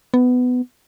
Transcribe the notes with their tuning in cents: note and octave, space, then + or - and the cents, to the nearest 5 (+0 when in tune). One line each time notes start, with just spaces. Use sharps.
B3 +15